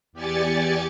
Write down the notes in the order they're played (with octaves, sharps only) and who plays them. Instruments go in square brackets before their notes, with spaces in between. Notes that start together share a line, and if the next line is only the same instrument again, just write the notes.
[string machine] E2 G4 D5 G#5 A6 C#7